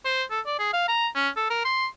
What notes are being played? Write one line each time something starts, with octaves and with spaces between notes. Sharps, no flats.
C5
A4
D5
G#4
F5
A#5
C#4
A4
A#4
C6